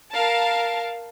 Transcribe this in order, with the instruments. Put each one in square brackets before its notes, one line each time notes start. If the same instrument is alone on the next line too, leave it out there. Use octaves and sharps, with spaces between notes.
[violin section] A#4 F5 A5